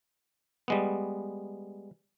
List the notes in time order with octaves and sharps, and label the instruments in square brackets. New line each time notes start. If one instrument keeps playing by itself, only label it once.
[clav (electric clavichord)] G3 G#3 B3